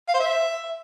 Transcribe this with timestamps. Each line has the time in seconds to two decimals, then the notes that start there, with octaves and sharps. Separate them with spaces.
0.08 F5
0.14 C5
0.20 E5